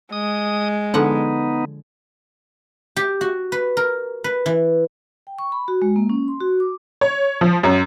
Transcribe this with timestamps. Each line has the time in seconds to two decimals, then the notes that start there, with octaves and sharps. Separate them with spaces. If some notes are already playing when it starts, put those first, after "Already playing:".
0.12 G#3 D#6
0.94 D3 F3 B3 D#4 F#5
2.96 G4
3.21 F#4
3.52 B4
3.77 A#4
4.24 B4
4.46 E3
5.27 G5
5.39 C#6
5.52 B5
5.68 F#4
5.82 G#3
5.96 A#3
6.09 C#4
6.28 C6
6.41 F#4
6.60 D6
7.01 C#5
7.41 F3
7.63 F#2